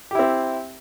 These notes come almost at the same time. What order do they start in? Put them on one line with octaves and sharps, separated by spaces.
G4 E4 C4